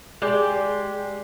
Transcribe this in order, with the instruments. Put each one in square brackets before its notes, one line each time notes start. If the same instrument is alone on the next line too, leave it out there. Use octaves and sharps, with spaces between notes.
[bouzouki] G#3 G4 D5